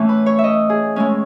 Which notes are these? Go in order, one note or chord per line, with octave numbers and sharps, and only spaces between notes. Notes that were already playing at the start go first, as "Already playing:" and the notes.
Already playing: A2 E3 A3 C#4 C#5
B4
C#5
E5
D#5
G#4
A2 G#3 C#4